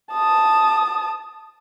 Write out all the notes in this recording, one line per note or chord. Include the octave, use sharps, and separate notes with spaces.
A5 D#6